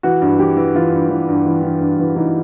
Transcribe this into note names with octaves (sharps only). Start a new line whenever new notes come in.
E3 F#4
G2
E3 G4
E3
E3 F4
G2
E3
G2
E3
E3
G2
E3
E3 D#4